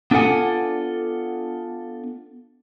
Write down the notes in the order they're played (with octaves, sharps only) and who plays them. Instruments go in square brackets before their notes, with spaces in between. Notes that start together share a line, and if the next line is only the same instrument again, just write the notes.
[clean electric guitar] B3 D4 F4 A4 F#5 G#5